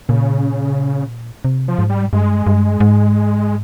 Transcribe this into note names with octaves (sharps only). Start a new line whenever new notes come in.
A#2 C#3
C3
F3
G#2
G3
G2 G#3
G2
G#2